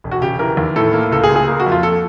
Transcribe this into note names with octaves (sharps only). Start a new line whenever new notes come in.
E1
F#4
C#3 G4
E3 A#4
D#2
A2 A4
A#3
C#2 A4
G#4
C#2
G#4
A#3
F#4
F2
F4
A4